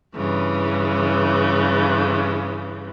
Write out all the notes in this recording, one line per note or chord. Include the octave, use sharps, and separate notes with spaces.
G2 C#3 E3